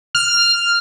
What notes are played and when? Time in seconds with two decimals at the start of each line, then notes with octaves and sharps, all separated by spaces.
0.15 F6